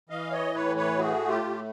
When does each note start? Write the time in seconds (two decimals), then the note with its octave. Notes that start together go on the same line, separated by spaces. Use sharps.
0.09 E3 D#5 F5
0.32 C#5 D#5
0.54 A2 B4 C#5
0.76 B4 C#5
0.98 A3 F#4 G#4
1.28 F4 G4
1.44 A2